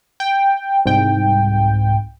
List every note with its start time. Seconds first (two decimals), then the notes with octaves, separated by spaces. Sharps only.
0.20 G5
0.86 C2 G#2 G5